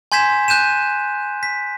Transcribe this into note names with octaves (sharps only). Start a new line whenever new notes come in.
G#5 C6 G6 G#6 B6 E7
F#6 G6 D#7 E7
B6